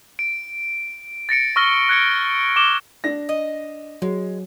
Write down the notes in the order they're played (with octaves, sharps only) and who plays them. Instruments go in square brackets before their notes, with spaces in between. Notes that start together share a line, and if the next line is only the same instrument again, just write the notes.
[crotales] D7
A6 A#6 C#7 D7
C#6 E6 F6 A#6 G7
F#6 G#6 C#7 D7
D6 E7 G7
[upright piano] D4 A#6
[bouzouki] D#5
[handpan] F#3 [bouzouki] G#3